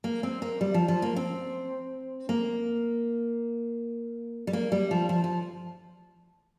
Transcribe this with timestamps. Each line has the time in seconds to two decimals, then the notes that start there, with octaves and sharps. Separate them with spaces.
0.04 A#3
0.23 C4
0.42 A#3
0.61 G3
0.74 F3
0.88 F3
1.02 A#3
1.16 C4
2.29 A#3
4.47 G3
4.53 A#3
4.72 G3
4.91 F3
5.09 F3
5.24 F3